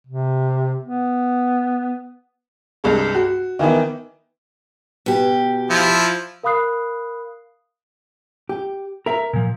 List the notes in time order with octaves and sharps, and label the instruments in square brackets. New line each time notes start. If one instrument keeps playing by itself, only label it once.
[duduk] C3
B3
[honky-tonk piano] C2 G2 G#3
F#4
D#3 E3 B3 E4
[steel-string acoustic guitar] B2 G4
[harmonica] F3 E4
[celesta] A#4 F5 B5 D#6 F#6 C7
[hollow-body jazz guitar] G4
[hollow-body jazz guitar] A#4 [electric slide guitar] E5 A#5
[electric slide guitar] A#2 F3